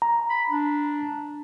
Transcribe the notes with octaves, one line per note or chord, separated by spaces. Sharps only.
A#5
B5
D4